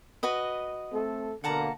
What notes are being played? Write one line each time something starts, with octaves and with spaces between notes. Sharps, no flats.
F#4 B4 D#5
A3 C4 A4
B2 D3 A#3 F#5 A5 A#5